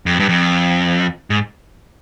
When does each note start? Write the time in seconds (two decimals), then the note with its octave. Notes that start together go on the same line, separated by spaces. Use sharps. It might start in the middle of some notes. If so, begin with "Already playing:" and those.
0.06 F2
0.20 G2
0.29 F2
1.30 G#2